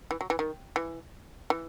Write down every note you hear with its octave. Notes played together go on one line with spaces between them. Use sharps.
E3
F#3
E3
D#3
E3
E3